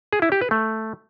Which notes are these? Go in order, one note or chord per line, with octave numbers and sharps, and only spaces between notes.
G#4
E4
G4
B4
A3